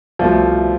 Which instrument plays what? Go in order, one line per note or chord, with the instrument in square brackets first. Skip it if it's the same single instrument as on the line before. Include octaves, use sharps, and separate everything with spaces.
[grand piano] C2 B2 A3 [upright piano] F3